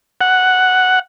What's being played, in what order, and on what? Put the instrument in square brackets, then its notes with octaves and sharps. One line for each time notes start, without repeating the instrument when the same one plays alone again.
[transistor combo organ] F#5